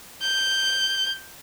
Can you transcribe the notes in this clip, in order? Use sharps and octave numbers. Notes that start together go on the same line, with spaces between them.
G6